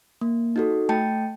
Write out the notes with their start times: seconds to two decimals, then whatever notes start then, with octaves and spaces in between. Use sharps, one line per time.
0.21 A#3
0.56 D#4 F#4 A4
0.89 A3 G5 A5